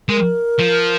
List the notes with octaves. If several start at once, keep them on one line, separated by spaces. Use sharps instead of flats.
G#3 A#4
F3